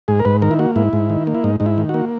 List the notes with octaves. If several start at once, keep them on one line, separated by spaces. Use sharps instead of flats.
G#2 G#4
A#4
G#2 B4
D#3 A#4
E4
A#3 F#4
G#2 E4
G#2
D#3
A#3
E4
G#2 D#4
G#2 D#4
E4
D#3
F#4
A#3